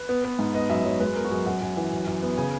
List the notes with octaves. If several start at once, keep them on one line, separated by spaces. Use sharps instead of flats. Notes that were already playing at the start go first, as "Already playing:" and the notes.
Already playing: B4
B3
B3
G#2
B3 D#5
F#2 E5
F#2 C#5
G#3 B4
B3 A#4
F#4
F#2 G#4
F#2 F#5
F#2 G#5
E3 F#5
F#2
F#2
B3
C#3 G#5